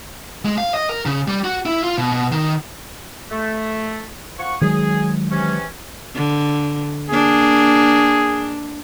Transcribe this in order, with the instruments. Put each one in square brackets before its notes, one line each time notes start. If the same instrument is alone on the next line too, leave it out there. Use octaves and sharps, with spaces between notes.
[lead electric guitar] G#3
F5
D#5
A#4
C#3
G3
F#4
E4
F4
B2
B2
D#3
[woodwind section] A3
F3 F#5 C#6
[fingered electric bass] D#3 F#3 G#3 [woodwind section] G#4
[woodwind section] C3 E3 C#4
[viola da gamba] D3
[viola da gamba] A#3 D4 [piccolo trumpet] G#4